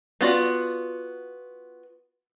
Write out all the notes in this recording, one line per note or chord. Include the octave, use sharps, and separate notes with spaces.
B3 F4 F#4 D5